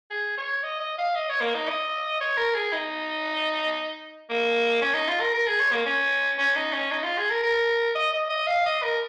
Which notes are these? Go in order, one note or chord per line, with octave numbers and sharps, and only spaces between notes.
G#4
C#5
D#5
D#5
F5
D#5
C#5
A#3
D#4
D#5
C#5
A#4
G#4
D#4
A#3
C#4
D#4
F4
A#4
A#4
G#4
C#5
A#3
C#4
C#4
D#4
C#4
D#4
F4
G#4
A#4
A#4
D#5
D#5
D#5
F5
D#5
A#4